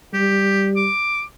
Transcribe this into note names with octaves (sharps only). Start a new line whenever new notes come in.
G3 G4
D6